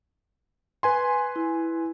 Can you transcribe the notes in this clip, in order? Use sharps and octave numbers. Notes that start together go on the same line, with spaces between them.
B4 G#5 C6
E4